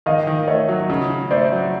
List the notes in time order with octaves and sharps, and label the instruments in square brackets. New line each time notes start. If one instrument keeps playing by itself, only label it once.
[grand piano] D#3 [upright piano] D#5 F5
[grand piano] D#3
[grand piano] A3 [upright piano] C#5 D#5
[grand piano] F#3
C#3
C#3
[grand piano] A3 [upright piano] C5 D5
[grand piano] F#3